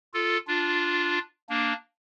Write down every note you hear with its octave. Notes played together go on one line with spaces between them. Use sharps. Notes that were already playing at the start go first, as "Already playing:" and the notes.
F4 A4
D4 F4
A#3 D4